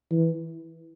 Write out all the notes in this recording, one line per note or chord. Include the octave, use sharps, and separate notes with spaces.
E3